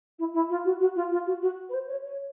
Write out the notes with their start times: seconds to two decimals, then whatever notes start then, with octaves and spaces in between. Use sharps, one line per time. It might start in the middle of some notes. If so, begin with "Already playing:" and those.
0.18 E4
0.33 E4
0.49 F4
0.64 F#4
0.80 F#4
0.95 F4
1.11 F4
1.26 F#4
1.41 F#4
1.68 B4
1.73 C5
1.87 C#5
2.03 C#5